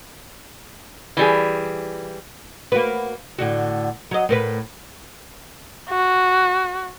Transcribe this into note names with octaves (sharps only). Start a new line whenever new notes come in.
E3 G3 G#4
A#3 F#4 B4
A2 D3 F#4
F#3 D#5
A2 A#4 B4
F#4